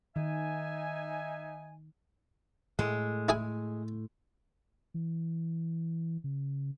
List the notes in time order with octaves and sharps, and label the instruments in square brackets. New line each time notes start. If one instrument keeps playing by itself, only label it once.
[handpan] D#3 [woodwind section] D#4 E5 G#5
[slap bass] A2 A3 [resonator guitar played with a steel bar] G#3
[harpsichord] E4 G#4 G#5
[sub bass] E3
C#3